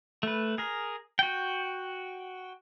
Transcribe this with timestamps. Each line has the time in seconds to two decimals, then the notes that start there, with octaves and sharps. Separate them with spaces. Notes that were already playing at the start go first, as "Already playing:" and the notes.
0.23 A3 B4
0.58 G#4 A#4
1.19 F#4 G5